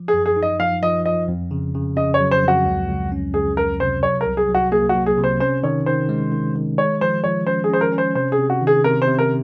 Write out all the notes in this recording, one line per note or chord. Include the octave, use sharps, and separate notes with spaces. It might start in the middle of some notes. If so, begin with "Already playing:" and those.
Already playing: F3
G#4
F#2
G#4
D#4
D#5
F3 F5
F3 D#5
F3 D#5
F2
C#3
C#3
C#3 D#5
C#5
F#3
C5
F2 F#4
C#2
C#2
C#4
C#2 G#4
C#2 A#4
C3 C5
F#3 C#5
A#4
C2
G#4
F#3
F#4
A#3 G#4
F#4
F#3
G#4
C3
C5
C#4 C5
D#3 C#5
D#3 C5
G#3
D#3
D#3
G#3 C#5
F3 C5
F3 C#5
C#4 C5
G#4
C#4 C5
A#4
C#4
C5
C3 C5
G#4
C3
F#4
D#3
G#4
C3 A#4
C5
C3
A#4